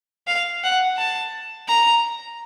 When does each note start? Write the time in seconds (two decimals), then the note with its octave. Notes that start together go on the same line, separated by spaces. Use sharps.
0.27 F5
0.64 F#5
0.98 A5
1.68 A#5